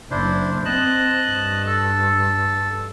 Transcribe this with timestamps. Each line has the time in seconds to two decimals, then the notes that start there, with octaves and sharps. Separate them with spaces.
0.11 F#1 D4 E4 C5
0.65 C4 D#5 A5 F#6
1.25 G2
1.67 A4